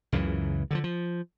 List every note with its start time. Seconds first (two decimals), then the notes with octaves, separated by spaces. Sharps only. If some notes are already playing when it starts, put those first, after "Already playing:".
0.12 C#2 F#2 C#3 E3
0.71 D3 D#3 F3
0.84 F3